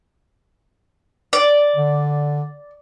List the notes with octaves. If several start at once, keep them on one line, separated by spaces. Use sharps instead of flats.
D5
D3